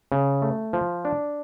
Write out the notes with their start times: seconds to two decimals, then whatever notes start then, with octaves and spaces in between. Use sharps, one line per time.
0.12 C#3
0.42 A3
0.73 F3
1.05 D4